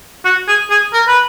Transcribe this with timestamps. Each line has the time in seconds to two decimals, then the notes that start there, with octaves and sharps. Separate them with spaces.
0.25 F#4
0.48 G#4
0.70 G#4
0.93 A#4
1.08 B4